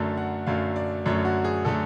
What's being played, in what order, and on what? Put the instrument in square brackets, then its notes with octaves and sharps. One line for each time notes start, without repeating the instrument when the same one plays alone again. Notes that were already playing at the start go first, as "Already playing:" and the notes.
Already playing: [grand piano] F#2 D3 F#3 A3 A5
F#5
F#2 D3 F#3 A3 F5
D5
F#2 D3 F#3 A3 C#5
F#4
G#4
D3 F#3 A3 A4